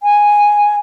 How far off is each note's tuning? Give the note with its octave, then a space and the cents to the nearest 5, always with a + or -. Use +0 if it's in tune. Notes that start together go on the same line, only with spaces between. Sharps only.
G#5 -5